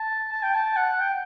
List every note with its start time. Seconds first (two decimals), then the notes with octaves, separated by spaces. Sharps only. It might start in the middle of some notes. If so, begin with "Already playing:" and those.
Already playing: A5
0.32 A5
0.43 G5
0.55 A5
0.76 F#5
1.00 G5